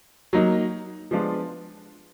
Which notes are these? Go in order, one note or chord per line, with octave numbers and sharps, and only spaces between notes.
F#3 A#3 D#4
F3 G#3 B3 D4 F4